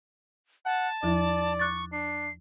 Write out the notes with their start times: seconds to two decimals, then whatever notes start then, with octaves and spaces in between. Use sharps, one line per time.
0.65 F#5 A5
1.03 E2 F3 E4 D5
1.59 C#6 D6 F#6 A6
1.92 D4 C7